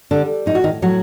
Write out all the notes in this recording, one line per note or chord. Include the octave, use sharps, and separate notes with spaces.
D3 G3 D4
A2 D#4
F#4
D#3 D#4
A2 F#3 F#4